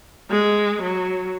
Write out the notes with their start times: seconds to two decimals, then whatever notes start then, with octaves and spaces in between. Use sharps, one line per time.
0.30 G#3
0.81 F#3